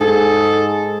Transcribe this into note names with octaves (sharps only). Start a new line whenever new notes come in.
G#2 G#4 A4